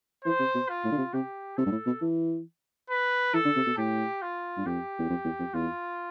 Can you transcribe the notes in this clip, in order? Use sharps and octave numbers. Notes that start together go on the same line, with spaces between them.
E3 C5
C3
B2
F4
A2
D3
C3
C3 G4
C3 A4
G2
A2
B2
E3
B4
E3 A4
D3
C3
B2
A2 G4
F4
G2
F2 G4
E2
F2
E2
F2
E2 F4